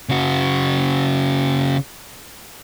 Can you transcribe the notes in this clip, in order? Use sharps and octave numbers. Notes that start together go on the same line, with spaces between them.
C#3 F#4